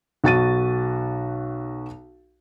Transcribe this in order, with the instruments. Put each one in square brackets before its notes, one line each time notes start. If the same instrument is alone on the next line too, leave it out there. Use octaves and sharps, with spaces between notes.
[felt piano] B1 F#4 A6 D#7